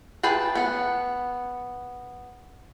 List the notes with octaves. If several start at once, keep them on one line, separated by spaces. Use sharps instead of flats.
G#4 B4 G5 A5
B3 F#5